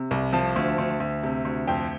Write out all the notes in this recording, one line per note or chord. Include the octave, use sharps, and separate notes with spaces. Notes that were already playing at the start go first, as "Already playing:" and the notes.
Already playing: C3
C2
F3 A5
D2
D2
D2
C3
D2
F2 G5